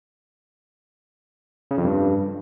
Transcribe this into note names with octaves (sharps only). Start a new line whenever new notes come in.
C#3
F2
G2